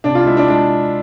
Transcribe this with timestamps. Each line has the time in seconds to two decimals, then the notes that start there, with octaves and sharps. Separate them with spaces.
0.04 C3 D4
0.15 F4
0.25 G#3 E4
0.37 D4
0.48 G#3 D4